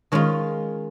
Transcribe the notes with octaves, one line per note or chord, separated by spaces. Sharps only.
D#3 G#3 C#4 F4